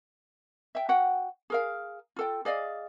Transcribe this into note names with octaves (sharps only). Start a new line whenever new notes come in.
E5 G5
F#4 F#5 G5
G#4 A#4 F5
F4 A4 G5
G#4 D5 D#5 F5